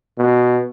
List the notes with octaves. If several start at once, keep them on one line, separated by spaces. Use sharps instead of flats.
B2